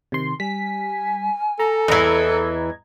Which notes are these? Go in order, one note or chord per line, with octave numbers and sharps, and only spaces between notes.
C3 D#3 C6
G3 G#5 B6
A4 A#5
E2 E3 D#5 A#5 G#6